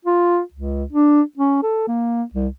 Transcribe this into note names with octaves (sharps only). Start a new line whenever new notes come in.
F4
C#2
D4
C#4
A4
A#3
C2